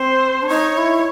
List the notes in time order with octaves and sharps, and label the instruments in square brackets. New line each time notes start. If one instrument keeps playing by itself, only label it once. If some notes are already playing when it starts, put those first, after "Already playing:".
Already playing: [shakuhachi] C4 [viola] C5
[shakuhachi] D4
[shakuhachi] D#4 [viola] C#5
[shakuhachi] E4